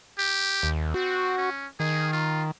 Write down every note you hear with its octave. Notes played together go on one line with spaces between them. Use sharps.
G4
D#2
C4 F#4
C#4
D#3 G#4
F4